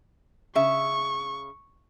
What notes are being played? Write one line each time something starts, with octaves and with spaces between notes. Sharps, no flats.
C#3 E5 C#6